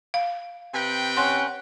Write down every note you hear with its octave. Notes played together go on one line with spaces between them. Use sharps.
F5
C3 B4 G5
C#4 F#5 C6